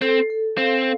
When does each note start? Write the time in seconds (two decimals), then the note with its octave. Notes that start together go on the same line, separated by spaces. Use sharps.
0.01 C4 A4
0.30 A4
0.57 C4 F5